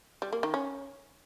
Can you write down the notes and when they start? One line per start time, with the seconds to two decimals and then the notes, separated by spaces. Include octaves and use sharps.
0.22 G3
0.33 A#3
0.43 D#3
0.54 C#4